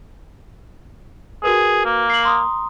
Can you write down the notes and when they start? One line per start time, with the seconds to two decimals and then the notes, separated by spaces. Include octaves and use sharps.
1.44 F#4 G#4 A#4 B4
1.85 A#3
2.10 C7 F#7
2.23 A#5 C6 D#6